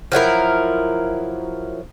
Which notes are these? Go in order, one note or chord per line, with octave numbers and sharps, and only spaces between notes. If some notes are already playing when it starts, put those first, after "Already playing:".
F3 F#3 E4 A#4